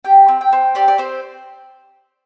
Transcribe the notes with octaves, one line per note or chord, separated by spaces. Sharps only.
G4 G5
C4
G5
C4
G4 D5
D5
C4 C5